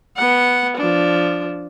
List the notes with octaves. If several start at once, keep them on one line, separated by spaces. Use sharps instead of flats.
B3 F#5
F3 D4